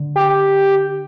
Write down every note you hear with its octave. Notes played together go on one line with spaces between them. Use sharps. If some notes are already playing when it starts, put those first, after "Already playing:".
Already playing: D3
G4